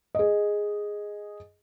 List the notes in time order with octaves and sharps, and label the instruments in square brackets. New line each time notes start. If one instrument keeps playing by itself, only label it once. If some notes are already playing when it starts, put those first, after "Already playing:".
[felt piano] G#4 D#5